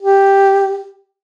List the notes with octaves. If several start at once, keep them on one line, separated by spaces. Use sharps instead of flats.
G4